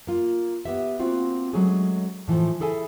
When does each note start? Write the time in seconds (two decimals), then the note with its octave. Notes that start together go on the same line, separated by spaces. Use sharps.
0.07 A#3 F4
0.65 B3 G4 E5
0.99 A#3 C4 F4 F#4
1.53 F#3 G#3 A3 C#4 F#4 G#4
2.28 A2 E3 F3
2.60 E4 G#4 A4 E5 G#5